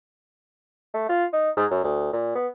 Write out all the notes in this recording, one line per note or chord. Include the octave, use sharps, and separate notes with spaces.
A3
F4
D#4
G#2
F#2
D2
A#2
B3